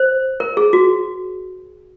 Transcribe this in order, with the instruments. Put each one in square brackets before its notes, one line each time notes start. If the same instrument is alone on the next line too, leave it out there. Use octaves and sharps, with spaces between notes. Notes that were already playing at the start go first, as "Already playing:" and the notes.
Already playing: [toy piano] C5
A#4
G#4
F#4